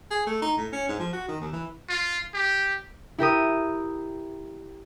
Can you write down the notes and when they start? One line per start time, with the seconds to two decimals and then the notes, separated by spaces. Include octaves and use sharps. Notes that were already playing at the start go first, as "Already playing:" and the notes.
0.11 G#4
0.26 A3
0.42 D#4
0.57 A2
0.72 C#4
0.88 G#2
0.99 F3
1.12 F#4
1.28 D#3
1.41 D#2
1.53 E3
1.89 F4
2.34 G4
3.18 E4 G4 A#4 D#6